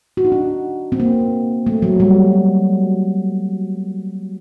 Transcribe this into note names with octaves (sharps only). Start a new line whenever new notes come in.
F#4
D#4
D4
C4
A#3
A3
F#3
G3